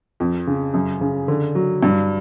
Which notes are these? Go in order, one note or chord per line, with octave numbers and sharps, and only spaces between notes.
F2
C#3
F#2
C#3
D3
F#3
G2